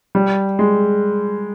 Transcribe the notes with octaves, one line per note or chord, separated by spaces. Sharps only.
G3
G#3